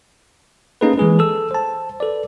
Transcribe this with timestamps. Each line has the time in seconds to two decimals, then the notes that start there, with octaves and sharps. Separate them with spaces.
0.81 A#3 C#4 D#4 G#4 A4 B4
0.98 E3 G#3 G#4 B4
1.19 A4 E6
1.51 C5 A5
2.00 A4 B4 D5